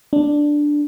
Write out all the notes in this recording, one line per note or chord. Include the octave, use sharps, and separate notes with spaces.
D4